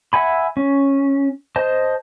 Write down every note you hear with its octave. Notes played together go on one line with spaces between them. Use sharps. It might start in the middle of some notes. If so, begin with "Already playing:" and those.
E5 F#5 G#5 B5
C#4
C5 D#5 A5